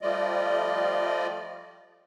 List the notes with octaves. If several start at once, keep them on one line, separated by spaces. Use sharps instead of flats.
F3 G3 A3 F4 D5 D#5